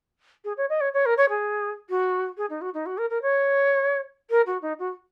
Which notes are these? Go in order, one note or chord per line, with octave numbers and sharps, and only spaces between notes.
G#4
C#5
D#5
C#5
C#5
A#4
C#5
G#4
F#4
G#4
D#4
F#4
D#4
F#4
A#4
A#4
C#5
A#4
F#4
D#4
F#4